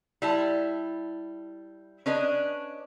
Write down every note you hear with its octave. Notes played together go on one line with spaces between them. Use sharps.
G3 E4 A5
C#4 D4 B4 D#5